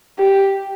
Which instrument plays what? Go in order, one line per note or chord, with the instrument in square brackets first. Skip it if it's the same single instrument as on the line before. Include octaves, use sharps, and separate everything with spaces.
[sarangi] G4